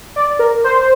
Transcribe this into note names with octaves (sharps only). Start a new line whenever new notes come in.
D5
A#4
C5